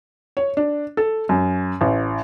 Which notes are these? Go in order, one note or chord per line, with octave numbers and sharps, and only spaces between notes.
C#5
D4
A4
F#2
A1